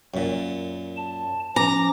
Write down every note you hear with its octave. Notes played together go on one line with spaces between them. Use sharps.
F#2 A#2
A5
F3 C#4 A#5 D6